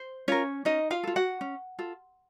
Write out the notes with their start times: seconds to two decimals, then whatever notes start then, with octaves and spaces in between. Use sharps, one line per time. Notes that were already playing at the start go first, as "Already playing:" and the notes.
Already playing: C5
0.28 C#4 F4 A#4 C#5
0.65 C#4 D#4 D#5
0.91 F4 F5
1.03 F4 A4
1.16 F#4 F#5
1.41 C#4
1.79 F4 A4